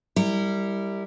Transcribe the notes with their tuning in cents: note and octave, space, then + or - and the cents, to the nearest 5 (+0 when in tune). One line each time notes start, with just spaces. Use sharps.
G3 +5 E4 -10 A#4 -25